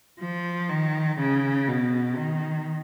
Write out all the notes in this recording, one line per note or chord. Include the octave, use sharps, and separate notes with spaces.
F3
D#3
C#3
B2
D#3